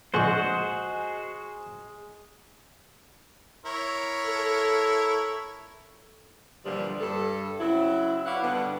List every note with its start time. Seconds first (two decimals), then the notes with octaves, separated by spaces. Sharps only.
0.14 A#1 D3 G#3 F#4 C5 C#6
3.66 E4 A#4 C#5
4.27 A4
6.65 A#2 D3 E3 F3 G3
7.00 G2 A4
7.59 C#3 F#3 C4 E4
8.25 E4 B4 C#5 D5 F5 F#5
8.43 G2 D3 G3 B3